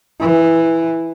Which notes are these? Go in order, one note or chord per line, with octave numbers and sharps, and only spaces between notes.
E3